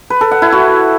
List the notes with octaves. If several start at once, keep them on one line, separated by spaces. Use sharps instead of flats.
B4
A4
F#5
E4
F#4